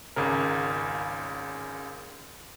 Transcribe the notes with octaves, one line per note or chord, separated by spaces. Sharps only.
G#1 C#2 C#3 A#4